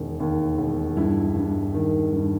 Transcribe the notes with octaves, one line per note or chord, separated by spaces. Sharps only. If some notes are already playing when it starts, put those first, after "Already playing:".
Already playing: E1 D#3
D#2
E1
G2 E4
G2
D#3
G2